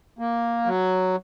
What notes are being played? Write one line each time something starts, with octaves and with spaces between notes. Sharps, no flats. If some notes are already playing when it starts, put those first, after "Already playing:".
A#3
F#3